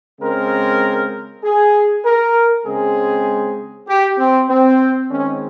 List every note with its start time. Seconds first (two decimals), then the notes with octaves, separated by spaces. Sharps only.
0.20 C#3 G#3 C4 A#4
1.44 G#4
2.05 A#4
2.65 C#3 G#3 C4 G#4
3.88 G4
4.19 C4
4.49 C4
5.11 D#3 G#3 C4 C#4